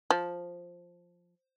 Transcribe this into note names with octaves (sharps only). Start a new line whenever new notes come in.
F3